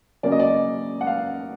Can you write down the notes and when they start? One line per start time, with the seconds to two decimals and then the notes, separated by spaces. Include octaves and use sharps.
0.23 C#3 F#3 A#3 C#4 D5
0.32 D#5
0.40 D5
1.01 F#5
1.07 F5